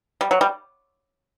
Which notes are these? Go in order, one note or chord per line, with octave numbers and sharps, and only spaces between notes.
G3
F#3
G3